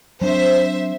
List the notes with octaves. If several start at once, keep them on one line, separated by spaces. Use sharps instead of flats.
F#3 C4 D4 C5 E5